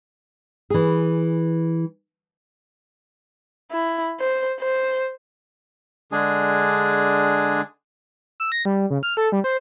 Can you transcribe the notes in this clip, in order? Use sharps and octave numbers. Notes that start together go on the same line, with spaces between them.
E3 G#4
E4
C5
C5
D3 G#3 D4 G#4
E6
A#6
G3
C#3
F6
A4
G3
C5